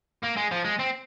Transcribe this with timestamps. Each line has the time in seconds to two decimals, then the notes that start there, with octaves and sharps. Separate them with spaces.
0.23 A#3
0.36 G#3
0.51 F3
0.65 G#3
0.79 C4